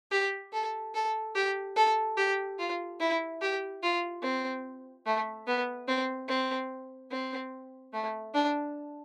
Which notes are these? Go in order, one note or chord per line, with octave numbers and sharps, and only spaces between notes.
G4
A4
A4
G4
A4
G4
F4
E4
G4
F4
C4
A3
B3
C4
C4
C4
A3
D4